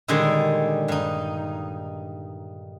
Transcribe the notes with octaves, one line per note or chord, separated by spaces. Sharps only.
A#2 D3 D#3 G3 G#3 G#4
G2 D#4